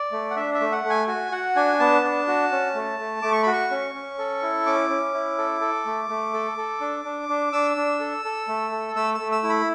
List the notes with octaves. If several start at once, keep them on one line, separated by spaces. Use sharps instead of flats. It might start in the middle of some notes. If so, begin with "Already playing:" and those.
Already playing: D5
A3
F#5
D4 E5
E5
A3
F#5
A3
G#5
F#4 G#5
F#4 F#5
D4 G#5
B3 A5
D4
F#4
C#4
A3
A3
A3 D6
C#6
F#4 B5
C#6
C#4
C#4
A4
E4
C#4 D6
C#4
E4
A4
A4
A3
A3
A4
A4
D4
D4
D4
D4 E6
D4
A4
A4
A3
A4
A3 E6
E6
A3
E6
E4
B5